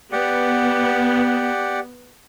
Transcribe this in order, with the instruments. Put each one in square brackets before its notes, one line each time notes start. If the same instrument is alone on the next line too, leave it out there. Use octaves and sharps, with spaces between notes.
[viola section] B3 [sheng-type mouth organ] G4 D5 F#5